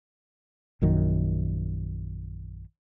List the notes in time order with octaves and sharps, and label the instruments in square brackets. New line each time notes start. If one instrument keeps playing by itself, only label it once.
[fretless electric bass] A#1 F#2 D#3